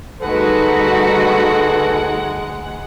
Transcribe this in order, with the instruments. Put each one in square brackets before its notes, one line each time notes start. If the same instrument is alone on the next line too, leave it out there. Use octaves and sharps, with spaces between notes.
[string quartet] D2 G#3 F#5 [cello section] G3 D#4 F#4 [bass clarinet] A4 [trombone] B4